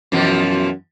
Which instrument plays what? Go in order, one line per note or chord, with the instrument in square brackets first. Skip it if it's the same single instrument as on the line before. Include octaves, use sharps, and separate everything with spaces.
[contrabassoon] F#2 [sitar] B2 E3 F3